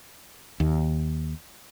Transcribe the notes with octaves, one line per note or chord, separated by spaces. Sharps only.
D#2